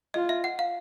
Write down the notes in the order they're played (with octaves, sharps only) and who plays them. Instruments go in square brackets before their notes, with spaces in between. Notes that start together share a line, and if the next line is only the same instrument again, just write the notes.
[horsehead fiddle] F4 [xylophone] D#5
[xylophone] E5
F#5
F5